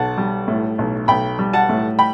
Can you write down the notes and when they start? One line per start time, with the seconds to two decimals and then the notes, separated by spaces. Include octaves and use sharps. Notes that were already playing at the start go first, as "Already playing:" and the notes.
Already playing: B1 F#5 A5
0.18 G3
0.48 A2
0.78 B1
1.08 B1 G5 B5
1.39 G3
1.53 F#5 A5
1.69 A2
1.99 G5 B5